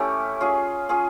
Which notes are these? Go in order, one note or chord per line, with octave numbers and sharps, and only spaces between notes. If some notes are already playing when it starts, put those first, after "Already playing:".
Already playing: A3 C#4 E4 G4
C#4 F4 G#4
C#4 F4 G#4